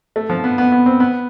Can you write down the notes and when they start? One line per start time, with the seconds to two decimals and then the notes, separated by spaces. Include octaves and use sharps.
0.16 A3
0.30 F3
0.44 B3
0.58 B3
0.72 B3
0.86 C4
1.00 B3